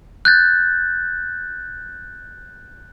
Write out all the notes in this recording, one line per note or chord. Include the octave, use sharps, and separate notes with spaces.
F#6 G6 A6